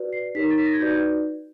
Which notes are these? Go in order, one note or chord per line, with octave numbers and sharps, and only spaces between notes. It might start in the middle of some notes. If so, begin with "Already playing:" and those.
Already playing: F#4 B4 D5
C7
D#4 G4 A#4 C#5 B6
A6
B6
A#6
G#6
D#4 F#4 B4 D5 G6